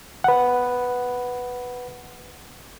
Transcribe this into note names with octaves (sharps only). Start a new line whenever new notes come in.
B4 F#5